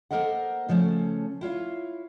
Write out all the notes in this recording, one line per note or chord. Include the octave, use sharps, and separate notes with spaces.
A#3 A4 A#4 C5 D#5 F#5
C#3 F3 A3 C#4
E4 F4 C#5 F5